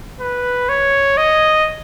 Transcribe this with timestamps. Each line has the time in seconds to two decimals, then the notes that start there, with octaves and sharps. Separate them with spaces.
0.21 B4
0.69 C#5
1.17 D#5